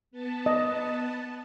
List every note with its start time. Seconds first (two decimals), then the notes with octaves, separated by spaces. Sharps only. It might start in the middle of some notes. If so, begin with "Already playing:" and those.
0.11 B3 A5
0.46 D#5